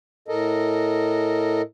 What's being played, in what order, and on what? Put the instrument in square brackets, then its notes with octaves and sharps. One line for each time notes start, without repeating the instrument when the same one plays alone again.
[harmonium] A2 A4 A#4 D#5